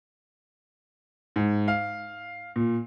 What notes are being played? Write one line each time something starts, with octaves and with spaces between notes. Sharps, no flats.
G#2
F5
A#2